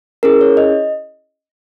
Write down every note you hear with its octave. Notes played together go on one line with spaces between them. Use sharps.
C#4 E4 G#4 A#4
C#5
D#5